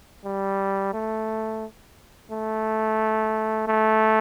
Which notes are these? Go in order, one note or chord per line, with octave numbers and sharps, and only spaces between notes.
G3
A3
A3
A3